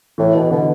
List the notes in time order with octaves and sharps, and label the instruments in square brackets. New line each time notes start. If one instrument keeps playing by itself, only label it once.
[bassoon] A2 [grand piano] E3
[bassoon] B2
[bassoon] B2 [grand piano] D3